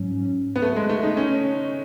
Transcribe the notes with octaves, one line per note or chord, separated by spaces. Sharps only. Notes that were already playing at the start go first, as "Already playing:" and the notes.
Already playing: G#2 F#3 C#4
B3
A3
G#3
A3
D#4
C#4